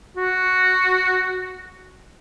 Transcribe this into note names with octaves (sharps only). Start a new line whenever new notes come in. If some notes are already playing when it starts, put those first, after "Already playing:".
F#4